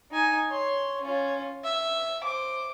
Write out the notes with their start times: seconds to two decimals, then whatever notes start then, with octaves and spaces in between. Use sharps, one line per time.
0.11 D#4 G#5
0.48 C#5 C6
1.01 C#4 F4
1.64 E5
2.24 C5 D6